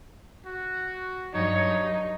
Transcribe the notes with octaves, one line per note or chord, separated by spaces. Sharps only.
F#4
G2 F#3 D#4 C#5